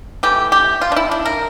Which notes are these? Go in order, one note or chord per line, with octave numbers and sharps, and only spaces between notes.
E3 A3 G4
G4
F4
D4
E4
D4
A#4